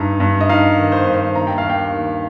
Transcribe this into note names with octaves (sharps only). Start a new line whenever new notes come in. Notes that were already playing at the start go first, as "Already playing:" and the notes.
Already playing: G2 D#4 A#5
G2
D#5
D#4 F5
D#3
C5
G2
C5
D#2 A#5
G5
F5
D#2
G5
D#3